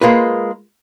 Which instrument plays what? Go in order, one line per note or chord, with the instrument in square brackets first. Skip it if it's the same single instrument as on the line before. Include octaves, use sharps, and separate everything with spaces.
[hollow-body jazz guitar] G#3 A#3 F4 B4